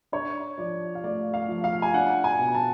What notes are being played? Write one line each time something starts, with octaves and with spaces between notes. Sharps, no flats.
D4 C#5
F3 D5
F5
A3 D5
F5
F3
F5
G#5
D4 F#5
G#5
B2
A5